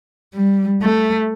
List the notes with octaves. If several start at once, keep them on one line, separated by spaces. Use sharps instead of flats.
G3
A3